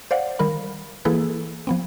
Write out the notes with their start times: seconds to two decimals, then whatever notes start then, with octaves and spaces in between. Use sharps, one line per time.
0.11 C5 D5 F5 F#5
0.39 D#3 G3 A#4 B5
1.05 E3 A#3 E4 G#4 A4 B4
1.67 F3 B3 C4